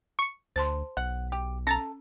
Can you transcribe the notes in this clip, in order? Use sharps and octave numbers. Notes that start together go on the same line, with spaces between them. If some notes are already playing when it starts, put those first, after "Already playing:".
C#6 C#7
D2 C5 A5 C6 A6
B1 F#5
G4
C#4 A4 A#5 A6 A#6